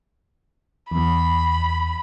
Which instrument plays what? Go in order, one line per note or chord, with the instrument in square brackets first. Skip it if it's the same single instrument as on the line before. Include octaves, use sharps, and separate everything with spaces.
[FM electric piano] E2 [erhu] B5